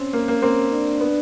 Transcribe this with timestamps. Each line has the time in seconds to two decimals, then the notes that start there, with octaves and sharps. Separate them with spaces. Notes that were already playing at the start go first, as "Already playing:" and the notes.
Already playing: C4 C#4
0.13 A#3
0.28 A#3
0.42 A#3 C4
0.71 D4
1.00 B3